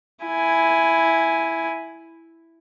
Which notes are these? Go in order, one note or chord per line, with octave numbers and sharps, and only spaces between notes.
E4 G#5